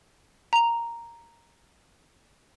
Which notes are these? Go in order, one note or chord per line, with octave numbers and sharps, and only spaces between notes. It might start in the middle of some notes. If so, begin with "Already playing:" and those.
A#5 F7